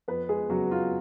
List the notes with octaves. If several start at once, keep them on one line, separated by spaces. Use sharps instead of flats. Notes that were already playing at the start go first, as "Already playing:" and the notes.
F2 B3 B4
G#3 G#4
C#3 F#3 F#4
F4